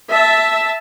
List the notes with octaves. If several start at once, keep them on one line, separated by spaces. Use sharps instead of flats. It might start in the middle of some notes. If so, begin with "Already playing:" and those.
E5 A5